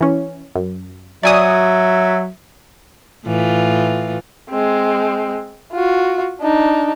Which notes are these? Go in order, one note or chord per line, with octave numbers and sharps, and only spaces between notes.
E3 C#4
F#2
F#3 D5 E5 G#5 D#6
A2 E3 F4
G#3 C4
F4 F#4
D4 D#4